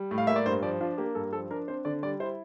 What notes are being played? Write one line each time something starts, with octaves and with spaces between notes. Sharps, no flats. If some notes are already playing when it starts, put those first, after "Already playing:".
Already playing: G3
A2
F5
A#3 E5
D5
G2 C5
F3 D5
D4 F4
A#3 G4
G2 A4
F3 A4
D4 A#4
C4 C5
D3 D5
G3 D5
E4 C5